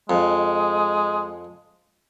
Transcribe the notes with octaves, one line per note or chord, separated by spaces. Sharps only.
F2 G#3